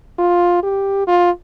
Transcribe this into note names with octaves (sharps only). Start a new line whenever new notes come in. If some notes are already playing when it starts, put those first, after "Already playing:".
F4
G4
F4